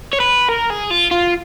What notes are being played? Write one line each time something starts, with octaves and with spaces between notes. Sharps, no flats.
C#5
B4
A#4
G#4
F4
F4